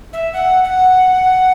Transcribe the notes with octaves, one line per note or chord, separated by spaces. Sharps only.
E5
F#5
F#5